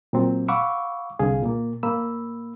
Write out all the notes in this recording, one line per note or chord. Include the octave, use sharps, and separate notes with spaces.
A#2 F#3 C4
F5 F#5 B5 C#6 D6 E6
C2 D3 G#4 F5
A#2 A#3
A2 A#3 B5 E6